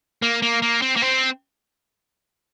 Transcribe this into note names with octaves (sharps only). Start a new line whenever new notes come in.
A#3
A#3
A#3
C4
A#3
C4